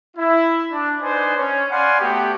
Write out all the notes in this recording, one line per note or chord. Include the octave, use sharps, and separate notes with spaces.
E4
D4
D4 D#4 B4 C5 D5 G#5
C#4
D5 F5 F#5 G#5 B5 C6
A3 B3 F#4 G4